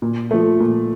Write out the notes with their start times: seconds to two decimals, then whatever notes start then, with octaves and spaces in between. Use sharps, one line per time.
0.02 A#2
0.31 F3 A3
0.60 A#2